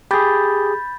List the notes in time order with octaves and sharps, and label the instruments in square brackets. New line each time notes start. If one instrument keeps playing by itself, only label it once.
[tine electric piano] G4 G#4 [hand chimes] B5 G6 A6